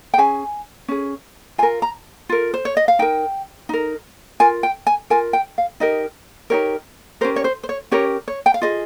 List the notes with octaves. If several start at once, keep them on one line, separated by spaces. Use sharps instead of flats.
G5
C#4 G#4 G#5
C#4 G#4
F4 A#4 G#5
A#5
F4 A#4
C5
C#5
D#5
F5
D#4 A#4 G5
D#4 A#4
F4 A#4 G#5
G5
G#5
F4 A#4 G#5
G5
F5
D#4 G4 A#4 D#5
D#4 G4 A#4 C#5
C#4 G4 A#4 C5
C#5
C5
C5
C#5
C#4 G4 A#4 C#5
C#5
G5
F5
F4 G#4 D#5